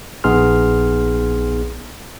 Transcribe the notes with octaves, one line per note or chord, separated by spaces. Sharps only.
A#1 B3 D#4 G#4 C6 F6